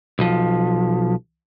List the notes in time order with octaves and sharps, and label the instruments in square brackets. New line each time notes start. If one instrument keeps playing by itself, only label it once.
[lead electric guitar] B1 F3